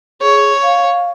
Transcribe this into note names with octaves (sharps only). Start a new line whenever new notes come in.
G#4 C#5
F5